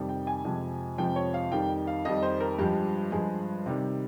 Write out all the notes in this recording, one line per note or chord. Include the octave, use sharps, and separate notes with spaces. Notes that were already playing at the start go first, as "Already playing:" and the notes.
Already playing: F2 C3 D#3 G3
G5
G#5
F2 C3 F3 G#3
F2 C3 F3 G#3 G5
C#5
F5
F2 D#3 G3 G5
F5
F2 D#3 G3 D#5
C5
A#4
G2 F3 G#3 G4
G2 F3 G#3 G#4
C3 D#3 G3